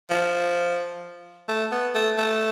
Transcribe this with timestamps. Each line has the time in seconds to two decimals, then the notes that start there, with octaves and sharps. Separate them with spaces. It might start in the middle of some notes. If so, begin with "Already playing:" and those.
0.10 F3
1.49 A3
1.72 B3
1.95 A3
2.18 A3